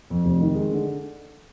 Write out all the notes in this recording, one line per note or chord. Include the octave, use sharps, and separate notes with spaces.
F2
F1
D#3
G#3
D3